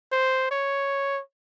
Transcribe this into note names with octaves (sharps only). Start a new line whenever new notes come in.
C5
C#5